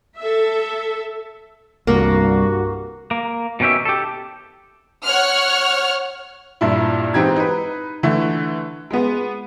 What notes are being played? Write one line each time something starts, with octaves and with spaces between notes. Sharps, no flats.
A4 E5
C2 G2 A#3 F#4
A#3
B2 D#3 C#4 G4 E5
G4 A4
C#5 F#5 F6
G2 A#2 E4
G#2 E3 C4 D#4 G4 G#6
D#4 B4
D3 E3 A3
G#3 B3